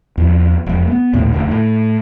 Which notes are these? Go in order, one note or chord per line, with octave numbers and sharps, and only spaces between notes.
E2 F3
E1 F2
A3 B3
A#1 D#2 A2
F1 D2 D3
A2